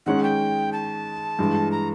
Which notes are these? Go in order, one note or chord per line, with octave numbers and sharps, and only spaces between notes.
D#3 G#3 C#4 F#5
G5
A5
G2 E3 G#3
A#5